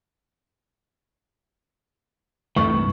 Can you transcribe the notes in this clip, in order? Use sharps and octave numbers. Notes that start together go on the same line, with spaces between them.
C2 G2 E3 A3 C#6